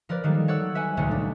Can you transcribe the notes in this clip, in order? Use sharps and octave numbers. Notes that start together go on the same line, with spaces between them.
F3 A#4 B4 D5
D#3 F#3 G3 A#3 A4
A4 C#5 D5 F#5 E6
B4 E5 F#5 G#5
D#1 C#2 G3 A3 C#4 C#5
D4